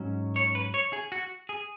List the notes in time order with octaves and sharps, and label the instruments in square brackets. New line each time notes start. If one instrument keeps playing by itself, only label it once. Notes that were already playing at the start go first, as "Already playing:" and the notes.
Already playing: [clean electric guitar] G#2 F#3 C#4
C#5
B4
C#5
G#4
F#4
G#4